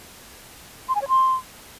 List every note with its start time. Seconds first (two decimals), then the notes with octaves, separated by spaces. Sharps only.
0.89 C6
0.95 G#5
1.02 C#5
1.08 C6